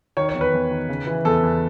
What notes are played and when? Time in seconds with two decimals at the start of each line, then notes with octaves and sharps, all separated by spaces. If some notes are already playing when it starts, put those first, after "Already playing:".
0.17 D#3 C#5
0.29 C#5
0.34 E2
0.41 B4
0.53 E2
0.71 D#3
0.89 C#3
1.07 E3
1.25 E2 A4
1.43 E2